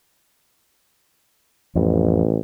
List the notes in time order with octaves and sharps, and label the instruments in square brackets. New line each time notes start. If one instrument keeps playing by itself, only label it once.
[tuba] A1 [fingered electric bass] F2